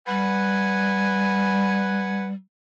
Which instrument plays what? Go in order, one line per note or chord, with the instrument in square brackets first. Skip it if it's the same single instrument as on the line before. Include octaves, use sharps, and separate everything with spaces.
[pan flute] G3 [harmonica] B4 F#5 G#5